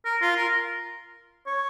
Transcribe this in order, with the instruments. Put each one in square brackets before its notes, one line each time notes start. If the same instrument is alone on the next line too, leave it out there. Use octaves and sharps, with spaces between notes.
[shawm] A#4
F4
A#4
C#5